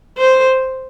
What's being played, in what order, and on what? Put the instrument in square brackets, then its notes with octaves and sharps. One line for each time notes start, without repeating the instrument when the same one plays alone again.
[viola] C5